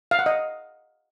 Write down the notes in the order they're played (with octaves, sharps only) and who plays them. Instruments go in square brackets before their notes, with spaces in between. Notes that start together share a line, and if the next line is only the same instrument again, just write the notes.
[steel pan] F5
F#5
D#5